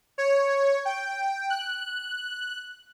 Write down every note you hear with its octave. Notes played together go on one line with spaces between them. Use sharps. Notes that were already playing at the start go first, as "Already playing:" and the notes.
C#5
G5
F#6